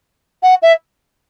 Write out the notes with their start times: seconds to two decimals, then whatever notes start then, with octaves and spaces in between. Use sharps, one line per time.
0.42 F#5
0.62 E5